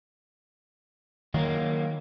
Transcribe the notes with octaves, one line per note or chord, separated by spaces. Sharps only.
D#3 F#3 A#3